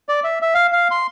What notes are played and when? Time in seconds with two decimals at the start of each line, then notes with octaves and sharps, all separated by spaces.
0.09 D5
0.24 E5
0.42 E5
0.55 F5
0.72 F5
0.91 C6